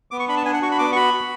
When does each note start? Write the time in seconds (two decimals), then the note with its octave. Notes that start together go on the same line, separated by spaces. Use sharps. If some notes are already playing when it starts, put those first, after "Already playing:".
0.11 B3 D6
0.19 C#6
0.28 D4 B5
0.37 A5
0.45 D4 G#5
0.53 F#5
0.62 F#4 C#6
0.71 B5
0.79 B3 D6
0.92 C#6
0.96 F#4 B5
1.14 F#4